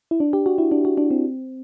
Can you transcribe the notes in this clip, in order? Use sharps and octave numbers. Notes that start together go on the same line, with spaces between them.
E4
D4
G4
F#4
E4
D4
F#4
D4
C4